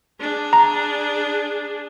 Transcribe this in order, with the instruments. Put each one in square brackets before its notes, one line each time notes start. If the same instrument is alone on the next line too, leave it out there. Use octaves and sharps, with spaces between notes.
[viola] D4 G#4
[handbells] A#5